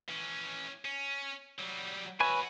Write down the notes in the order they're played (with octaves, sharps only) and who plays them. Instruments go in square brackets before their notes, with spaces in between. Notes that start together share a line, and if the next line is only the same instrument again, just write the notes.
[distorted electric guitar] E3 C#4
C#4
F#3 G3
[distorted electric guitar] F#4 E5 [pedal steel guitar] B4 C#5 G#5